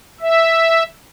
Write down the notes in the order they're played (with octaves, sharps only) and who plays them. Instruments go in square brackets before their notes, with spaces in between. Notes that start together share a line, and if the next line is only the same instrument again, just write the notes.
[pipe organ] E5